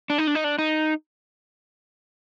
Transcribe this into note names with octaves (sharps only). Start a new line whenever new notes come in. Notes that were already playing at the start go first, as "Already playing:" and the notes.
D4
D#4
D4
D#4
D4
D#4